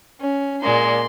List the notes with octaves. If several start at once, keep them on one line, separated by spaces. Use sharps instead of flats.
C#4
A#2 G#3 A#3 D5 C6